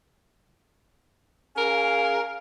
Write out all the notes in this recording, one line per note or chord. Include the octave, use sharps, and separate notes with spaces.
C#4 G#4 A#4 F5